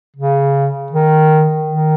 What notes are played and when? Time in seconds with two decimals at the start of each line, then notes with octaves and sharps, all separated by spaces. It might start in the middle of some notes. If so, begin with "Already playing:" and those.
0.16 C#3
0.92 D#3
1.67 D#3